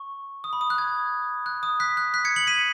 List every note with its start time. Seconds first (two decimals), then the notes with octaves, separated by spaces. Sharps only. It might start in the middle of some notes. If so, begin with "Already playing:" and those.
Already playing: C#6
0.44 D#6
0.53 B5
0.61 D#6
0.70 F#6
0.78 D#6 G#6
1.46 F#6
1.63 D#6
1.80 F#6 B6
1.97 F#6
2.14 F#6 B6
2.25 G#6 C#7
2.36 C#7 F#7
2.47 B6 D#7